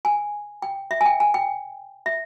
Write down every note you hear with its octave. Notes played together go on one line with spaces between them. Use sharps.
G#5
G5
E5
G#5
G5
G#5
G5
E5